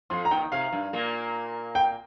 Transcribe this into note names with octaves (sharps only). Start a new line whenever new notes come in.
F2 F3 C6
A#5
D#2 D#3 G5
C3 F5
G2
A#2 A#3
G5